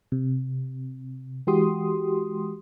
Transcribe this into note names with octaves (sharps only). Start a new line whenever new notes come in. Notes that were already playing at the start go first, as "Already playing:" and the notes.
C3
E3 G#3 F#4 G4 C6 D#6